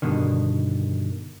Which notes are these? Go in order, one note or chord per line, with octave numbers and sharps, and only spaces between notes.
G2 B2 D3 D#3